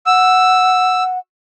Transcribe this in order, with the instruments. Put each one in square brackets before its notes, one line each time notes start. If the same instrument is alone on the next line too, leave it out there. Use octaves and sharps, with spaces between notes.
[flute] F#5 [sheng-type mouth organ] E6